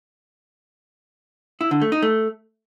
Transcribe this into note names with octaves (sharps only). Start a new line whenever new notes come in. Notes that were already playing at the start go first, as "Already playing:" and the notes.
E4
D3
A3
D#4
A3